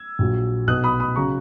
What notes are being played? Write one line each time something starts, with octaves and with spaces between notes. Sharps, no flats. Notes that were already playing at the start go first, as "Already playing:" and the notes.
Already playing: E6 G#6
A#1 A#2 F#3
B1 B2 F#3 D#6 F#6
B5 D#6
B5 D#6
C#3 F#3 A#5 C#6